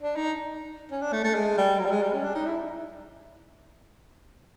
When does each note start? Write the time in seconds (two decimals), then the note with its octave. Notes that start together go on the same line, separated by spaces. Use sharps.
0.03 D4
0.16 D#4
0.91 C#4
1.02 D4
1.13 A3
1.24 A3
1.35 G#3
1.58 G3
1.79 F#3
1.85 G3
1.91 G#3
2.02 G3
2.13 C#4
2.24 D4
2.35 D#4
2.46 E4